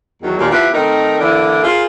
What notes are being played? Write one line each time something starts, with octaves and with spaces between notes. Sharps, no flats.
E2 D#3 F#3
D#2 A#2
F3 B3 E4 G4 B4
D#3 A3 C4 D#4 A#4
D3 E3 A#3 D4 E4
F4 G#4 A#4 C5